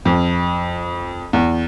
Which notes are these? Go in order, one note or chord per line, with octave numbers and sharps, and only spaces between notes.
F2
E2